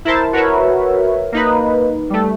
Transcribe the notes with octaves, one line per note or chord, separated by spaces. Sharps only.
E4 A#4 C5 A5
F#4 A#4 B4 C#5 E5
A#3 D#4 B4
G3 A3